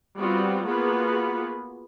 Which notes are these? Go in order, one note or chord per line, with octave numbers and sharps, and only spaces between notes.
G3 B3 C4 F4 F#4
A#3 B3 F4 F#4 G#4 B4